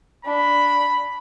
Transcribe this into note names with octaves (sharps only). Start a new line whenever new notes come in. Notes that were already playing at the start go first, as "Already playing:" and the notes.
D4 B5